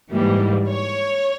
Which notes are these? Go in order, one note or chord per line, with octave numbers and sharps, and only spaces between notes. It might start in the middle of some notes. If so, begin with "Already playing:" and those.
G#2 E3 G3 A#3
C#5